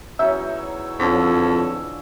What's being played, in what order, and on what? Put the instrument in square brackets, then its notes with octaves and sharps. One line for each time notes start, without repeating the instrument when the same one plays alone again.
[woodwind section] E2 C#5 E6 [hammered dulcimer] F#3 C#4 D#4 [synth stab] E5
[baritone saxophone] F2 [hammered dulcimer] D3 F3 C#4